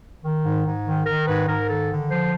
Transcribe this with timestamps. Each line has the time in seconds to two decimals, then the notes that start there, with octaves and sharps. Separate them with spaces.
0.24 D#3
0.44 G#2
0.65 G#2
0.86 D#3
1.06 D#3 A#4
1.28 G#2 B4
1.49 G#2 A#4
1.69 D#3 A4
1.90 D3
2.10 F3 C5